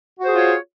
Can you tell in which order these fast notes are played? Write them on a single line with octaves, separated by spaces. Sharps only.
F#4 C5 G#4 F4 C#5